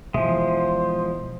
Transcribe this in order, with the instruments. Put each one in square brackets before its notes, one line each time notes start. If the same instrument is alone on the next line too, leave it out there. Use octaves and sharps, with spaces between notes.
[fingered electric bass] B2 E3 [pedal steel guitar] F3 G#3 [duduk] C5 [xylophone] E5